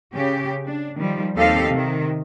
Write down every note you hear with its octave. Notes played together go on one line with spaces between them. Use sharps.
C#3 G4
D4
D#3 F3 G3
D#2 C4 G4 A4 D#5 F5
C3 D#3